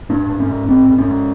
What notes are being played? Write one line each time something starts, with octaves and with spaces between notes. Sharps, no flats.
G#2 D4
G#2
C#4
G#2
G#2 C4
G#2
C#4
G#2